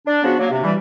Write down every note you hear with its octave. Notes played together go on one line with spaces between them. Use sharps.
D4
C#3 F3 B3 D4 F#4
F#3 A#3
C3
E3 G3